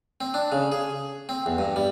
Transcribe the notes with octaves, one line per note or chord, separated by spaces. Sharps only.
C4
D4
C#3
G#4
C4
E2
G2
G3